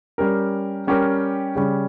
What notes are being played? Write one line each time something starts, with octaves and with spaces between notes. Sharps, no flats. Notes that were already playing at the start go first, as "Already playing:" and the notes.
G3 C#4 G4 A#4
G3 C#4 G4 A#4
C#3 G3 C#4